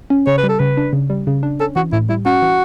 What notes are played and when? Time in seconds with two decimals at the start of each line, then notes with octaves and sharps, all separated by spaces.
0.10 C#4
0.27 C#3 C#5
0.38 B4
0.43 G3
0.49 A4
0.59 C#3 B4
0.77 D4
0.93 C#3
1.10 G3
1.27 C#3
1.43 D4
1.60 C#4 A4
1.76 E3 F#4
1.93 A2 E4
2.09 G3 E4
2.26 C#4 F#4
2.42 E3